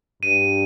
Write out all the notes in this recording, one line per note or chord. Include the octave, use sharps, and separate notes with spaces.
G2 D#7